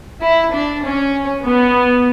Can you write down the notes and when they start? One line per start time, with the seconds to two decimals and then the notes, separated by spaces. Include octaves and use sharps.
0.22 E4
0.54 D4
0.84 C#4
1.45 B3